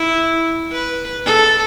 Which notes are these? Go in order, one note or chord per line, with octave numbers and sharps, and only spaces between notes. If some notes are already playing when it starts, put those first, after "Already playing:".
Already playing: E4
B4
A4